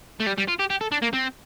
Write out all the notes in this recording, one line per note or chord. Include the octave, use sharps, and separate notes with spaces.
A3
G3
G3
F4
G4
G4
A4
D4
A#3
C4